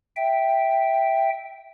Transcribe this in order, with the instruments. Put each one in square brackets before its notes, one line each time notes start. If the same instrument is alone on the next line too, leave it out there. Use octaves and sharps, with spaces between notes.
[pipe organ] E5 G5